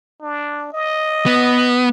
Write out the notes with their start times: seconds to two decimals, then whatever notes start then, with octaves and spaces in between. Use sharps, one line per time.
0.22 D4
0.73 D#5
1.26 B3